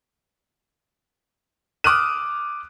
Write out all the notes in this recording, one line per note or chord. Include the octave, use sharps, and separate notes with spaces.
D6 D#6 F6 F#6 D#7